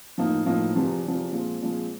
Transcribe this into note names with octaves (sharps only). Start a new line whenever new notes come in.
A2 F3 A#3 D#4
A2 F3 A#3 D#4
E2 C3 F3
E2 C3 F3
A#2 F3 G#3 C4
A#2 F3 G#3 C4